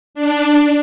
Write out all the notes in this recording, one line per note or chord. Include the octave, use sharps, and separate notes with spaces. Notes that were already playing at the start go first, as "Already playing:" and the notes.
D4